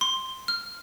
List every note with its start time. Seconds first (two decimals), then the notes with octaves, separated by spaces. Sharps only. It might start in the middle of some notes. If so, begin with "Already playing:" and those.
0.01 C6
0.48 F6